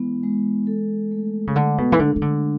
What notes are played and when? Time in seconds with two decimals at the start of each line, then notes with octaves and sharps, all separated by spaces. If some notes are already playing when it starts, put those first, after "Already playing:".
Already playing: E3 G#3 B3 E4
0.23 G#3
0.67 A4
1.12 A3
1.47 C#3
1.55 D3 A4
1.78 B2
1.92 E3
1.99 D3 D4
2.16 E3
2.22 D3